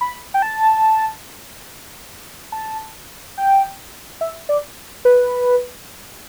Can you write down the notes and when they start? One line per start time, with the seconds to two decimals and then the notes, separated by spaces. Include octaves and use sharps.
0.01 B5
0.34 G5
0.42 A5
2.52 A5
3.37 G5
4.21 E5
4.49 D5
5.05 B4